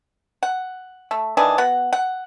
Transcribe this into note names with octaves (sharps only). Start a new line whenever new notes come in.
F#5
A3
D#3 E3 D4 G#4
B3 F#4 F#5
F#5